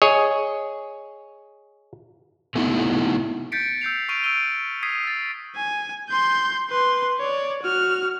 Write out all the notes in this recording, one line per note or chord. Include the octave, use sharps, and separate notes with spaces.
G#4 C#5 D#5 G#5
C3 A3 B3 D#4 E4 F#4
G6 A6 B6 C#7 D7
E6 G6 C7 F7
C#6 F6 D7 D#7 F7
E6 D7 D#7 G7
D#6 G#6 B6 C7 D#7
E6 A6
G#5
C6 G6
B4 C6
C#5 D5
F#4 F6